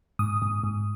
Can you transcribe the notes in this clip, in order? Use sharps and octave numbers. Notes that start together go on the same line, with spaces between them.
G#2 D#6
G#2
G#2